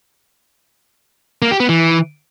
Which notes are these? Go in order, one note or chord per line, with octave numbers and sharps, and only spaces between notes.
A#3
G4
B3
E3